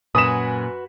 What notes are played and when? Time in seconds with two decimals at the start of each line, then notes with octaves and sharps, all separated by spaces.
0.15 F#2 A#2 F#4 B4 G#5 D#6 B6 E7